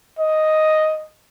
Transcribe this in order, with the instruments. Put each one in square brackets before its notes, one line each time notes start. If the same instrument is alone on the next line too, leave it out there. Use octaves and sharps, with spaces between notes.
[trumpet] D#5